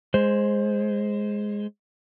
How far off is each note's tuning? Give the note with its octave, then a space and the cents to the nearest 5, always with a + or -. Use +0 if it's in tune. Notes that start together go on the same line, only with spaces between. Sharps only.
G#3 +0 C5 +10